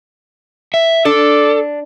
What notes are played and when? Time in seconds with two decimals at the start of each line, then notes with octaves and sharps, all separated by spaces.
0.74 E5
1.05 D4 A4 D5